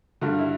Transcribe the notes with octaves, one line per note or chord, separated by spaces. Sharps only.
G2 D3 G3 F#4
E4